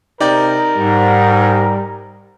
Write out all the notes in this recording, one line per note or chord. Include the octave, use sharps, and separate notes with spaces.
C3 D#4 A#4 D5 G5
G#2 G3